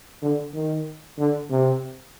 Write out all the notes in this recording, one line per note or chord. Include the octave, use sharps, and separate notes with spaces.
D3
D#3
D3
C3